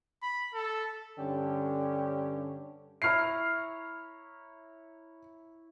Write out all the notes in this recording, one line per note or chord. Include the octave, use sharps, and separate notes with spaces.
B5
A4
G2 D3 C#4 G4
E4 C#5 A#5 F6 C7